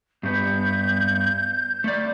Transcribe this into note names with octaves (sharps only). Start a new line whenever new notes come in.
G2 B3 G6
A3 D5